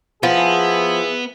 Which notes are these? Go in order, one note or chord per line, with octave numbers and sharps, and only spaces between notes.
F3 B3 E4 G#4